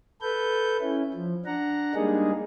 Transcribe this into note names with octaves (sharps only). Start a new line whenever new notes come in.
A4 B4 G6
C#4 E4
F3
D4 F#5 A#5
G3 G#3 A#3 D4 D#4 G#4